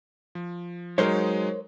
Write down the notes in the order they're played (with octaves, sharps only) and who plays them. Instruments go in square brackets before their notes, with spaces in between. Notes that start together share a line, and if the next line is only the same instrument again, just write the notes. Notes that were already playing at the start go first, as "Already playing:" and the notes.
[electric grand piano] F3
[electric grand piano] F#3 G#3 D#4 [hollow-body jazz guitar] A#4 C5 C#5